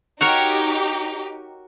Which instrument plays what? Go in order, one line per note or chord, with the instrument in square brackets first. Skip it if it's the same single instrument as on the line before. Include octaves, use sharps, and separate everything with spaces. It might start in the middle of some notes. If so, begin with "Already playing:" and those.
[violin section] D#4 G4 [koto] F#4 A#4 C#5